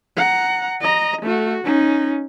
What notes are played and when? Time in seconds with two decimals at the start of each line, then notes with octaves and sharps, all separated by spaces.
0.17 F#5 A#5
0.81 D#5 A#5
1.22 A3 F#4
1.65 C#4 D#4